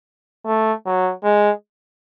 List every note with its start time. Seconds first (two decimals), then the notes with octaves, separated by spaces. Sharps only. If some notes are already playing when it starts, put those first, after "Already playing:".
0.46 A3
0.86 F#3
1.24 G#3